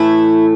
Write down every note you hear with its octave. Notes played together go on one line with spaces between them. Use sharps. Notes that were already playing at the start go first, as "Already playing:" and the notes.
Already playing: A2 E3 A3 E4